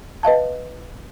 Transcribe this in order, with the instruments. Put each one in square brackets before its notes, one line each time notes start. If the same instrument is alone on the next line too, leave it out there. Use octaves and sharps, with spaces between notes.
[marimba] B4 D#5 F5 A5